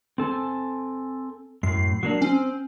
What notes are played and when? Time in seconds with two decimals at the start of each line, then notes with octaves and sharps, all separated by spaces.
0.18 C4 A4 G#5
1.63 F#2 A2 C7
2.03 F#3 A#3 D4
2.22 C4 C#4